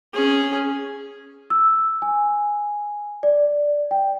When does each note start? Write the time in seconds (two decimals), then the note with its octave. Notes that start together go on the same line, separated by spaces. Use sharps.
0.14 C#4 G#4
1.50 E6
2.02 G#5
3.23 D5
3.91 G5